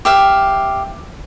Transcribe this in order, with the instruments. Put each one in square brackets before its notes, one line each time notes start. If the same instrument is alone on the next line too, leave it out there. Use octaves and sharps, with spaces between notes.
[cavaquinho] G4 E5 F5